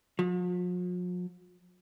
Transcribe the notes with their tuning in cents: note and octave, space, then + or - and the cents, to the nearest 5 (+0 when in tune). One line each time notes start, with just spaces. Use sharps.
F3 +45